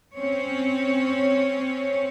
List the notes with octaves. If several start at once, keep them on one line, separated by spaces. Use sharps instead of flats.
C4 C#4 C#5